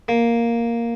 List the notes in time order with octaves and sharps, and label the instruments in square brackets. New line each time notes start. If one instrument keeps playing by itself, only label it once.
[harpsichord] A#3